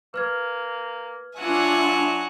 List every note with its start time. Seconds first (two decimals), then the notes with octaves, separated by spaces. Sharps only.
0.14 A#3 B4 F6 G#6
1.37 F#3 D4 F4 E5 F#5 G#5